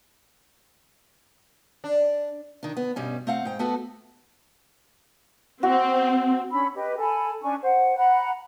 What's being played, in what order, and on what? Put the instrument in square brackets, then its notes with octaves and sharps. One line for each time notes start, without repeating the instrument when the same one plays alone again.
[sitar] D4
[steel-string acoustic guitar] D#3 D4
B3
G2 B2 G3 C#4
A3 C4 F5 F#5
G#2 G5
A3 B3 F#4 A4
[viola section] C4 [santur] F#4
[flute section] C#4 D4 B5 E6
G4 B4 D#5
A4 G#5 A5 B5
C#4 D4 G#5 C#6
C5 F#5
F#5 A#5 B5 F#6